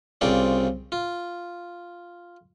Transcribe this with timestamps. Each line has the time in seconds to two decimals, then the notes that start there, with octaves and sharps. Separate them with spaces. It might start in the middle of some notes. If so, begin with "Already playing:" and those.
0.21 C2 C#3 C4 F4 D5
0.92 F4